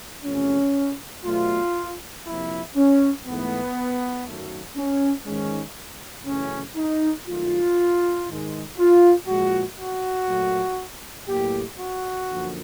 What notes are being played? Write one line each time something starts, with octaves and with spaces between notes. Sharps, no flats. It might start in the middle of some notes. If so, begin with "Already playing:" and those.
E2 C3 F3 A3 C#4
B2 F#3 A3 F4
F2 C3 F3 A#3 E4
C#4
G#2 E3 A3 B3
F#2 D#3 F#3 A3
C#4
G#2 D#3 G#3 C#4
F#2 C#3 E3 A3 C#4
D#4
G2 D#3 F#3 A3 F4
G#2 D#3 G#3
F4
A#2 F3 G#3 F#4
F#4
A#2 F#3 A3
A2 F#3 A#3 G4
F#4
F#2 D3 F3 A#3